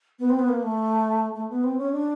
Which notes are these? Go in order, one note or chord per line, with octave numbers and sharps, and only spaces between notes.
B3
C4
B3
A#3
A3
A3
B3
C4
C#4
D4